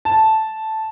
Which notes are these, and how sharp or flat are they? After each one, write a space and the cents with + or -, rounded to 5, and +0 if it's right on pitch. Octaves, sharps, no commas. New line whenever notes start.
A5 -5